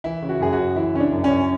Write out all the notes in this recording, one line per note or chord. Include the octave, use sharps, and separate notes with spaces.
E3 E4
C#3
F#4
F#2 G#4
F#4
F#2
E3 E4
C#3 C#4
D4
F#2
C#4
F#2